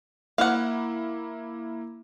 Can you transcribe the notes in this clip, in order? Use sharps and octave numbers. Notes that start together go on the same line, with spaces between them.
A#3 E4 F5 F#5